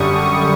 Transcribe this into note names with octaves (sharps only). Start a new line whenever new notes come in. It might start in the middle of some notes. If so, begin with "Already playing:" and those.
Already playing: F#2 D3 G3 C#6 D#6